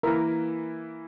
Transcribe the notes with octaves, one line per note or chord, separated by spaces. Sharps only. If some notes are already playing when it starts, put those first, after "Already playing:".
E3 A#3 E4 A#4